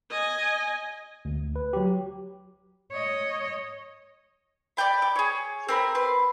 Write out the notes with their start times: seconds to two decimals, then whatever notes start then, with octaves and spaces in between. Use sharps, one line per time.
0.10 D#5 G#5
1.25 D2
1.56 B4
1.73 F#3 G4
2.92 C#5 D#5
4.77 D5 E5 G5 B5
4.98 B5 D6
5.16 G#4 C#5
5.68 C4 A#4 B5
5.95 B4 C6